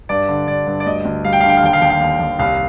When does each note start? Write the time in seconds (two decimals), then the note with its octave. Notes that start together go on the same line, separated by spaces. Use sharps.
0.09 G2 D5
0.28 D3
0.48 G2 D5
0.67 G2
0.80 D5
0.86 D2 D#5
1.05 D2
1.24 G3 F5
1.33 G5
1.41 D3 F5
1.49 G5
1.57 F5
1.62 D#2 G5
1.73 F5
1.81 D#2 G5
1.90 F5
2.01 D#2
2.20 D#2
2.39 C2 F5